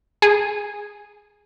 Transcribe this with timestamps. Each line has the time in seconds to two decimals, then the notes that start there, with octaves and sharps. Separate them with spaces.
0.22 G#4